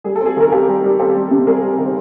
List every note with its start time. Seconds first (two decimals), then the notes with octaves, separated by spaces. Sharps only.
0.04 G3 G#4
0.16 A4
0.21 C4 F#4 G#4
0.37 D#3 A#4
0.52 C4 G4 A4
0.68 G3
0.84 G3
0.99 C4 G4 A4
1.15 G3
1.31 C3
1.47 G3 G#4 A#4
1.63 G3
1.78 D#3
1.85 C5